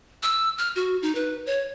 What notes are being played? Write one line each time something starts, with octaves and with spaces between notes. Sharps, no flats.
E6
F6
F#4
D#4
B4
C#5